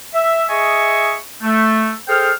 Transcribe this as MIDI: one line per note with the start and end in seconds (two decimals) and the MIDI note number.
0.14 0.44 76
0.49 1.17 68
0.49 1.17 75
0.49 1.17 76
0.49 1.17 80
0.49 1.17 85
1.42 1.91 57
2.08 2.31 68
2.08 2.31 69
2.08 2.31 72
2.08 2.31 79
2.08 2.31 89